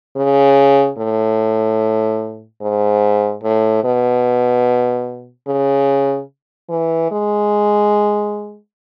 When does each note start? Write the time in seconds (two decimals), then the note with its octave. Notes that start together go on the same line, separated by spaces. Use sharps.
0.17 C#3
0.98 A2
2.62 G#2
3.43 A2
3.84 B2
5.47 C#3
6.70 E3
7.11 G#3